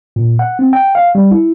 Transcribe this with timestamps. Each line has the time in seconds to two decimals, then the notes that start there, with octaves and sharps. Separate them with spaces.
0.16 A#2
0.39 F#5
0.59 C4
0.73 G5
0.95 F5
1.15 G3
1.31 E4